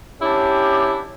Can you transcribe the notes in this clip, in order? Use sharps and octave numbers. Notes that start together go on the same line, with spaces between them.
C#4 D4 E4 G4